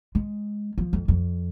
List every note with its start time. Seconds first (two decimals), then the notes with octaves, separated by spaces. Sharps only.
0.15 G#3
0.78 F3
0.93 F2
1.08 F2